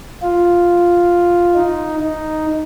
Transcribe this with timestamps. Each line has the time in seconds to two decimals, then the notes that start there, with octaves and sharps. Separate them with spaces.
0.22 F4
1.55 D#4
2.00 D#4